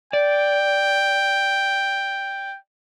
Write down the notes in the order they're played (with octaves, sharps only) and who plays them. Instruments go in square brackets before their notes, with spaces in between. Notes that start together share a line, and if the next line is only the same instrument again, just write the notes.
[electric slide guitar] D5 [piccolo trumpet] G5